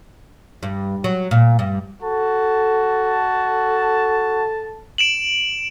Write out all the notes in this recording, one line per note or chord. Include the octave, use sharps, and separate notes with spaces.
G2
F#3
A#2
G2
F#4 A4 A5
D7 E7 F#7